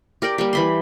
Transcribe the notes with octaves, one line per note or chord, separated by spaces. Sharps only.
G4 A#4 D5 G5
G3 A#3 G4
E3 B5 C6